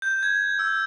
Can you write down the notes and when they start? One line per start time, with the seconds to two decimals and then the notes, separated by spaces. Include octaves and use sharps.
0.02 G6
0.23 G#6
0.59 E6